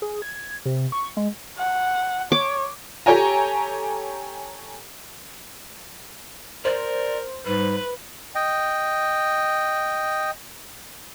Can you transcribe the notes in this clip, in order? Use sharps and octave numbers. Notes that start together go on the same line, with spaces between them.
G#4
G#6
C3
C#6
G#3
F#5
C#5 D6
G4 A4 C#5 G5 G#5 A#5
A#4 C5 D5
G#2 G3 B4
D#5 G5